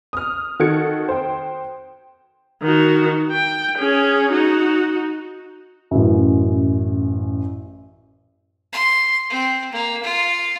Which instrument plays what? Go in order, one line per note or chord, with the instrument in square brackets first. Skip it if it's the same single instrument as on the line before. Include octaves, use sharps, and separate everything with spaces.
[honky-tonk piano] D#6 F6
D#3 F#4 A4 G#6 C#7
C5 G5
[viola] D#3 F#4
G5
C#4 G#4
D#4 F#4
[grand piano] A1 F#2
[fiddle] C6
C4
A#3
F4